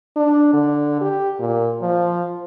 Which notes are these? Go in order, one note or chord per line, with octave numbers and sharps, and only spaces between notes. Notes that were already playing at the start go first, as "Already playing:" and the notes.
D4
D3
G4
A#2
F3